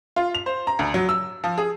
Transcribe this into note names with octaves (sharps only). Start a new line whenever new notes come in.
F4
F7
C5
A#5
D2
F#3
E6
F3
G#4